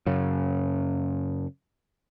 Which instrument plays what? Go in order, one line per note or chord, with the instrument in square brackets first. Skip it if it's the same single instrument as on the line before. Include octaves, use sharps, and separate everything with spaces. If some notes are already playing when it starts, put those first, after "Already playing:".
[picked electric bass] F#2 C#3